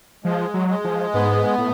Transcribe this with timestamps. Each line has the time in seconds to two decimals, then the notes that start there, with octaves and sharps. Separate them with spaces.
0.24 F3 G#3
0.54 F#3
0.69 G#3
0.85 F3
1.14 G#2 B3
1.58 A2